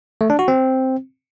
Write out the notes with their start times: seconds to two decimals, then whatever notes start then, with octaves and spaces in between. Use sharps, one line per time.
0.21 A3
0.30 D4
0.39 F#4
0.48 C4